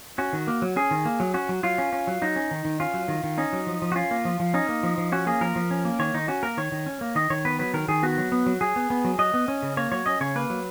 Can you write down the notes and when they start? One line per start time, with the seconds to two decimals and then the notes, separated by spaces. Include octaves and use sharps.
0.18 C#4 F#4
0.33 D#3
0.47 A#3
0.62 F#3
0.76 C#4 G#4
0.91 D#3
1.05 A#3
1.20 F#3
1.34 C#4 F#4
1.49 F#3
1.63 F#3 F4
1.78 C#4
1.93 C#4
2.07 F#3
2.22 F#3 D#4
2.36 C#4
2.51 D#3
2.65 D#3
2.80 C#4 F4
2.94 F#3
3.08 D#3
3.24 D#3
3.38 C#4 D#4
3.53 F#3
3.67 F3
3.82 F3
3.92 F#4
3.95 C#4 F4
4.11 A#3
4.25 F3
4.40 F3
4.54 C#4 D#4
4.69 A#3
4.83 F3
4.98 F3
5.12 C#4 F#4
5.27 A#3 G#4
5.41 F3 A#4
5.56 F3
5.71 C#4
5.85 A#3
5.99 D#3 C#5
6.14 D#3 D#4
6.28 C#4 F#4
6.43 A#3 A#4
6.57 D#3 C#5
6.72 D#3
6.86 C#4
7.01 A#3
7.15 D#3 D#5
7.30 D#3 C#5
7.45 B3 B4
7.59 F#3 B4
7.74 D#3 A#4
7.88 D#3 G#4
8.03 B3 F#4
8.18 F#3
8.32 B3
8.46 F#3
8.61 F#3 G#4
8.76 B3
8.90 B3
9.05 F#3
9.19 F#3 D#5
9.34 B3
9.48 C#4
9.63 C#3
9.77 A#3 C#5
9.92 F#3 C#5
10.06 C#4 D#5
10.21 C#3 C#5
10.35 A#3 B4
10.50 F#3